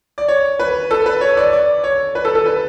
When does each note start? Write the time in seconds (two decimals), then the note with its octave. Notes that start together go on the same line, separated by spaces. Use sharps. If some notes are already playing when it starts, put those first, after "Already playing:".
0.18 D5
0.28 C#5
0.59 B4
0.91 A4
1.06 B4
1.21 C#5
1.37 D5
1.53 D5
1.84 C#5
2.15 B4
2.25 A4
2.35 A4
2.46 B4